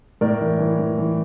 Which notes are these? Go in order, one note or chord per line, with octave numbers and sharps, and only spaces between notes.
A2 A#4 D5
E3
E3
E3
E3